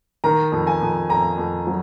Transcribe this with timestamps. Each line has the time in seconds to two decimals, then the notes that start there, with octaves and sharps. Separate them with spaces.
0.24 D#3 A#5
0.52 F2
0.67 G#5
0.81 F2
1.09 F2 A#5
1.38 F2
1.67 F#3